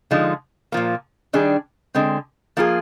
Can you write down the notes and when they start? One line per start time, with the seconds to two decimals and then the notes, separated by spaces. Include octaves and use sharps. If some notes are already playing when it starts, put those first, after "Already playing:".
0.11 D3 F3 G#3 D#4
0.72 A#2 F3 A#3
1.33 D#3 G3 D4 G#4
1.95 D3 G#3 C4
2.57 F3 A#3 F4 G#4